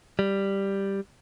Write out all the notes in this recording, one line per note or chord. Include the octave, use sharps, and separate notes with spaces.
G3